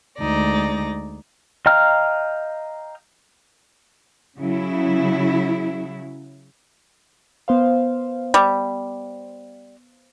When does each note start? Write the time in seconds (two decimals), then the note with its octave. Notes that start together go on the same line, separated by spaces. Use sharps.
0.19 D2 G#3 D#4 D5 A#6
1.66 D#5 F5 G5 A#5 F6
4.38 C#3 F#3 E4
7.48 B3 C5 F5
8.34 G3